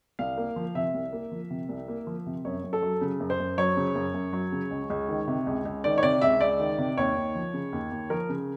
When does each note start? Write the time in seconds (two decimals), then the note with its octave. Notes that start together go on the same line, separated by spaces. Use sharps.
0.19 C2 F5
0.38 A#3
0.56 F3
0.75 C3 E5
0.94 C2
1.13 A#3
1.32 F3
1.50 C3
1.69 C2
1.88 A#3
2.07 F3
2.26 C3
2.45 F#2 C#5
2.64 F#2
2.73 A4
2.82 F#3
3.01 C#3
3.20 F#2
3.30 C5
3.40 F#2
3.58 F#3 C#5
3.77 C#3
3.95 F#2
4.14 F#2
4.33 F#3
4.52 C#3
4.71 C#2
4.90 C#2
5.09 D#3
5.28 C3
5.47 C#2
5.65 C#2
5.84 D#3 D5
5.98 C#5
6.03 C3 D5
6.22 C#2 E5
6.41 C#2 D5
6.60 D#3
6.78 C3
6.97 D#2 C#5
7.16 D#2
7.35 F3
7.54 C#3
7.73 D#2
7.91 D#2
8.10 F3 A#4
8.29 C#3